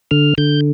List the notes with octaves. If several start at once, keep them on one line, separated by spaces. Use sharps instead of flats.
D3 F6
D3 G6